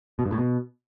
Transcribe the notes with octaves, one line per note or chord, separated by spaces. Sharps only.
B2
G2
A2
B2